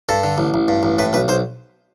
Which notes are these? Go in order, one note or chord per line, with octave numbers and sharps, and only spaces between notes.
G2 A4
D3
A1
A1
G2
A1
A2 B4
B1 B4
B1 C5